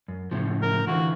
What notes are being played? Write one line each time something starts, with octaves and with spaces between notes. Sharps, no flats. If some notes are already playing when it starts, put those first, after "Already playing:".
F#2
A2 C#3 F3
A#4
D3 E3 F4 F#4